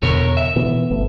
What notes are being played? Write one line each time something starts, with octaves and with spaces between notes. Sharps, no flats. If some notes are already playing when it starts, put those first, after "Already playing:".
E2 B2 D3 A4 A#4 C#5
E5
B2 E3 B3
G1 A3 B3